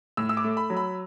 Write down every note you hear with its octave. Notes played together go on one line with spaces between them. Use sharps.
A2 E6
E6
D6
A3
B5
F#3
B5